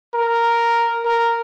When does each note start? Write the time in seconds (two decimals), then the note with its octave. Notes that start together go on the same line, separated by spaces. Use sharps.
0.14 A#4
1.05 A#4